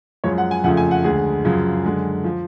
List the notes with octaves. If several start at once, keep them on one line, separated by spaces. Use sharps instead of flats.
F#2 F3 G#3 C#5
F#5
G#5
F2 C#3 F3 A3 F#5
G#5
F#5
D2 D3 G#3 G#4
F#2 C#3 F3
F#2 D3 G#3
F3